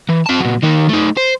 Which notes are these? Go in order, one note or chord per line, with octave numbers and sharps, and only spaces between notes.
E3
C4 A5
A#2 F#3
D#3 A#3
A3 D#4
C5